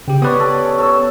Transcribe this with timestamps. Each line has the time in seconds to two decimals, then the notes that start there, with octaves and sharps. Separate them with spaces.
0.08 C#3 G4 G5
0.22 B3 G4 B4 C#5 D5 D#6
0.40 A4
0.65 C#4
0.78 A4 C#5 E6